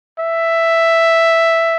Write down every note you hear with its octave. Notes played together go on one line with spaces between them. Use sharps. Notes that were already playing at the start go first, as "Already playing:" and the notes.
E5